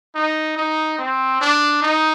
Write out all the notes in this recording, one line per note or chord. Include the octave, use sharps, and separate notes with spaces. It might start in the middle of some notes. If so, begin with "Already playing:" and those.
D#4
D#4
C4
D4
D#4